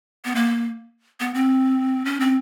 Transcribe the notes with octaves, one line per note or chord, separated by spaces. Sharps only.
B3
A#3
B3
C4
C#4
C4